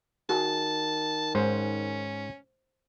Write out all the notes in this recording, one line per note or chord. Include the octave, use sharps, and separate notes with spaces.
D#3 F#4 G#4 A5
G#2 C#4 C5